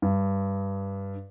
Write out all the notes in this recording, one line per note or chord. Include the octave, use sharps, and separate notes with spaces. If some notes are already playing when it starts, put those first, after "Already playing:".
G2